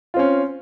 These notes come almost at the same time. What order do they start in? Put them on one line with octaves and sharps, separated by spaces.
F4 C4 C#4